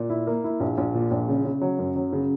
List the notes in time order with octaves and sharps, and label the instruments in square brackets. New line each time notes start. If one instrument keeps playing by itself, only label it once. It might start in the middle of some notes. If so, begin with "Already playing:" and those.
Already playing: [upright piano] A#2
E4
A#3
E4
A#1
A#1
A#2
A#1
C#3
C#3
F#3
F#2
F#3
C#3